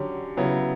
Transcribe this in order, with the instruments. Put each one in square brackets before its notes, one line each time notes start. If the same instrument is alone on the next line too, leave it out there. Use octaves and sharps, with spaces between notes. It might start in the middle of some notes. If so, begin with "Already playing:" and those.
Already playing: [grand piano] D3 F#3 C#4 G4
C#3 F#3 B3 E4